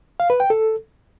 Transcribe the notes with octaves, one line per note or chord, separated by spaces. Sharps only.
F5
B4
G5
A4